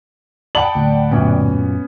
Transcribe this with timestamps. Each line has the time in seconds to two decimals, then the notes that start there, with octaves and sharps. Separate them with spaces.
0.55 D5 F#5 G5 A5 B5 D#6 F#7
0.75 D1
1.11 F#2 A#2 B3 C#4